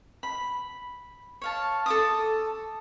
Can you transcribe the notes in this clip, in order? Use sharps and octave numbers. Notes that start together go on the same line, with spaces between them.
B5
C#5 F5 A5
A4 D6 D#6